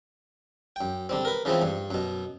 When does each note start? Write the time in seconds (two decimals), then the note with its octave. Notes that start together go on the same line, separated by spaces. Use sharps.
0.76 F#2 G5
1.09 D3 G3 C4
1.25 A#4 B4
1.45 C#3 E3 F3 B3 C4
1.62 G2
1.91 F#2 B2